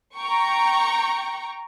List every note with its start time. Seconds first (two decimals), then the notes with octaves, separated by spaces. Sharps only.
0.15 G5 A#5 C#6